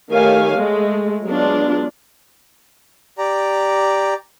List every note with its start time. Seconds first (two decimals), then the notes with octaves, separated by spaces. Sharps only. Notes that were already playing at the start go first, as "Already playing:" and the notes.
0.11 D#3 A3 G4 C#5 F5 G#5
0.54 G#3 A3
1.24 F#3 G#3 B3 D4 F4
3.18 G4 D5 A#5